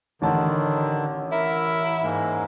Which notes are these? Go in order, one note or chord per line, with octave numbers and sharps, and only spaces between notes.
A1 D3 D#3 A5
E4 A#4 E5
G#2 G#3 A#3